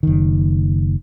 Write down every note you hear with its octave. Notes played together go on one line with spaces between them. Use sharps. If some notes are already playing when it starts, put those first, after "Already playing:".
F#1 D#3